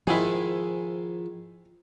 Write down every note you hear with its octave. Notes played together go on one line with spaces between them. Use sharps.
G#2 D#3 F3 G#3 E4 G#4